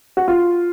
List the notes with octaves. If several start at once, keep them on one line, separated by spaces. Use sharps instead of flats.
F#4
F4